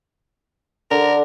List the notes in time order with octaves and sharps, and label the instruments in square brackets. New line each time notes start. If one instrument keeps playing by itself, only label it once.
[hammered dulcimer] D3 [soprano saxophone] A#4